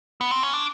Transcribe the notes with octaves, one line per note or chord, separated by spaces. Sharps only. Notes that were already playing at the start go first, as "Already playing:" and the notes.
B3
C4
C#4
D4